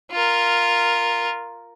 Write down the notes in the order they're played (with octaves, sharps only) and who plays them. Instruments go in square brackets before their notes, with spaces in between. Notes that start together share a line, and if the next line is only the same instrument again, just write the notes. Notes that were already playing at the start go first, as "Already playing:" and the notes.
[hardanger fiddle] F4 A#4